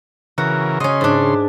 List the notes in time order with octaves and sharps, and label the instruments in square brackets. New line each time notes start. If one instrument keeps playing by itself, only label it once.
[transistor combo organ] C#3 E3 A#4 [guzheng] F#4
[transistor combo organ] C#3 C6 [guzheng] C#4 D#5
[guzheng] G#2 D4